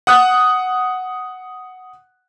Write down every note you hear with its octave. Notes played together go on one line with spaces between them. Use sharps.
F#5 D#6 F#6